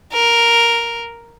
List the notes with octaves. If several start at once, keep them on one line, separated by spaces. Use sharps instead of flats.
A#4